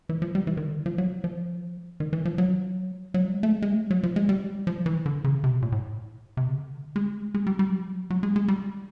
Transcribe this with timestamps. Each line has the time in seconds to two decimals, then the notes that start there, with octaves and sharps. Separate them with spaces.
0.09 E3
0.22 F3
0.35 G3
0.47 E3
0.57 D#3
0.67 D3
0.76 D#3
0.86 F3
0.98 F#3
1.24 F3
2.00 D#3
2.13 E3
2.25 F3
2.38 F#3
3.14 F#3
3.24 G3
3.33 G#3
3.43 A3
3.52 G#3
3.62 G#3
3.71 A3
3.81 G#3
3.91 F#3
4.03 F3
4.16 G#3
4.29 G3
4.67 F3
4.86 E3
5.06 D3
5.24 C#3
5.44 C3
5.53 B2
5.62 A#2
5.72 A2
6.37 C3
6.48 C#3
6.58 D3
6.96 G#3
7.34 G#3
7.47 G3
7.59 G3
7.69 F#3
7.78 F3
7.87 F#3
8.10 F#3
8.23 G#3
8.36 G#3
8.48 G3